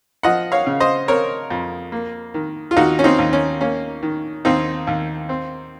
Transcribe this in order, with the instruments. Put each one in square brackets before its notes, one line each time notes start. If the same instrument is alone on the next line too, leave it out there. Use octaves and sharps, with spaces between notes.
[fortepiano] F3 D#5 F#5
C#5 F5
C#3
C5 D#5
C4 A#4 C#5
F2
A#3
D#3
F4
D#2 D#4 F#4
C#4
C4 D#4
D#2
C#4
A#3 C#4
D#3
D#2 C4 D#4
D#2
C4